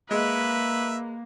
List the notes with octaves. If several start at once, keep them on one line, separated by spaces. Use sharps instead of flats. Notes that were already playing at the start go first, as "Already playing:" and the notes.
G#3 A#3 B4 E5